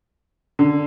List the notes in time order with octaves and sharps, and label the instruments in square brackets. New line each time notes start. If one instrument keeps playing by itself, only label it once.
[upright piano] D3